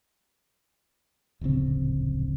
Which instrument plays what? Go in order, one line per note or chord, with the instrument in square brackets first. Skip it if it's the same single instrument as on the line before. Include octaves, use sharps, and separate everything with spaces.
[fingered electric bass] D1 A#1 C#3 C4